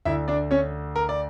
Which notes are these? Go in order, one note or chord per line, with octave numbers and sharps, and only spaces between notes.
D2 D3 E4 E5
D4 D5
C#4 C#5
A#4
D5